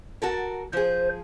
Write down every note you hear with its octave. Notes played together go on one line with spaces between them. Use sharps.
F#4 A4 A#4
F3 G#4 C5